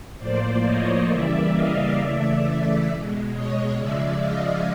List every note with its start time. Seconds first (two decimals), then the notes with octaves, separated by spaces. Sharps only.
0.18 A2 F3 A#3 C5 D5
0.64 C#5 D#5
1.09 C#3 E3 G3 A#3 D5 E5
1.52 D#5 F5
1.98 C#3 E3 A3 D5 E5
2.87 B2 G#3
3.31 C#5 D#5
3.76 C#3 F3 G#3 D5 E5
4.21 D#5 F5